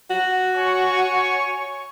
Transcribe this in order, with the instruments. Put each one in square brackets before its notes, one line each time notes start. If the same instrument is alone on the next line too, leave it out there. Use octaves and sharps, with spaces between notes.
[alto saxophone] F#4
[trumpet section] C#5 G#5 C#6